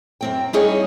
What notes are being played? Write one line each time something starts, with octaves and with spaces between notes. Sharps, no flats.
F#2 C4 G5
G3 C#4 D#4 E4 G#4 C#5